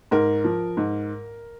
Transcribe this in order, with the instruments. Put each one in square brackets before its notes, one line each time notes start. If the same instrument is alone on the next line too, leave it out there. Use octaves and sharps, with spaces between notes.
[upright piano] G#2 A#4
F3
G#2